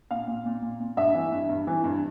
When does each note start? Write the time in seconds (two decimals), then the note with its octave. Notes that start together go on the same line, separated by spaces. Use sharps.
0.11 A#2 F5
0.27 A#2
0.45 A#2
0.62 A#2
0.80 A#2
0.97 G2 E5
1.14 E3
1.32 G2
1.49 G2
1.67 E3
1.84 G2